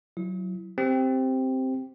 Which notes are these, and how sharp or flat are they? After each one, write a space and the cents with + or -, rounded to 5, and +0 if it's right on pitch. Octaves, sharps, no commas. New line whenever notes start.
F#3 +0 E4 +20
C4 +0 G4 +0